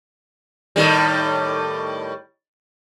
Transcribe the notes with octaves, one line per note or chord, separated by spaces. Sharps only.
A2 D#3 G3